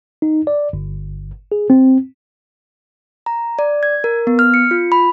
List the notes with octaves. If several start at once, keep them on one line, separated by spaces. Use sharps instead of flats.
D#4
D5
G1
G#4
C4
A#5
D5
G#6
A#4
B3
F6
C#7
F4
B5